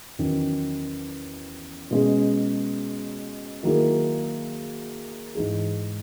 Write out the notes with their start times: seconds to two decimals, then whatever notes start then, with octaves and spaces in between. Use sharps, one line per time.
0.19 E2 D#3 F#3 C#4
1.91 B2 G#3 C#4 G#4
3.63 D#3 F#3 A#3 E4 G#4
5.35 G#2 E3 G#3 D#4 G#4